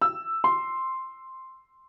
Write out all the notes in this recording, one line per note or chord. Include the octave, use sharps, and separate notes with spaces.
E6
C6